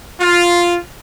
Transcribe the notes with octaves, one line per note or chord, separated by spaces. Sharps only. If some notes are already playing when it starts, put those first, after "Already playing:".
F4